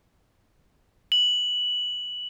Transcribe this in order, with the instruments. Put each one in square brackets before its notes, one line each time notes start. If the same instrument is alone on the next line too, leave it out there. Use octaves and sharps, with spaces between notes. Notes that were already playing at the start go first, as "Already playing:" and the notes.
[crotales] F#7